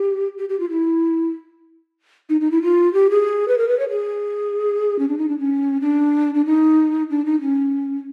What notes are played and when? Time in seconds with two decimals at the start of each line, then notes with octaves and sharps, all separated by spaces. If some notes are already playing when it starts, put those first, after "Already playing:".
Already playing: G4
0.38 G4
0.49 G4
0.60 F4
0.70 E4
2.29 D#4
2.41 D#4
2.51 E4
2.63 F4
2.93 G4
3.11 G#4
3.48 B4
3.58 A#4
3.68 B4
3.79 C#5
3.90 G#4
4.99 C#4
5.08 D4
5.18 D#4
5.29 D4
5.39 C#4
5.81 D4
6.35 D4
6.45 D#4
7.10 D4
7.25 D#4
7.41 C#4